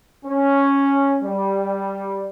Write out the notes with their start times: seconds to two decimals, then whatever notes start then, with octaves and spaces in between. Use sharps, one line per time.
0.25 C#4
1.23 G3